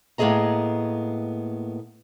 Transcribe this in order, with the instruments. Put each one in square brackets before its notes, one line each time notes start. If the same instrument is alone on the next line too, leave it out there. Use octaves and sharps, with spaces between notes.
[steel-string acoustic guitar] A2 A#3 B3 G#4 D#5 A#5